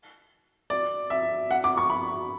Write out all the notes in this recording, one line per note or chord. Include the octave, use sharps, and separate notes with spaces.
D5
E5
F#5
D6
C#6
B5